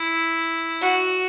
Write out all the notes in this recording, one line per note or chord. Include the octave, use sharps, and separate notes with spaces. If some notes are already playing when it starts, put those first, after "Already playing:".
Already playing: E4
F#4